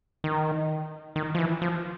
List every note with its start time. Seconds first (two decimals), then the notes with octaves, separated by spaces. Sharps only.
0.24 D#3
1.16 D#3
1.35 F3
1.38 E3
1.62 F3